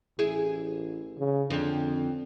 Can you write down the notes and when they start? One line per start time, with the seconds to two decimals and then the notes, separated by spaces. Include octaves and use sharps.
0.19 A1 E4 G#4
1.18 C#3
1.50 F2 D3